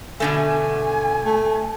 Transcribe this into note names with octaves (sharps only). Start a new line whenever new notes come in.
B2 D3 A3 G#5
A3